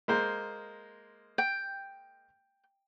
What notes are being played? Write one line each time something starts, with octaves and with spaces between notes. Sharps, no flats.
G#3 A#3 C5
G5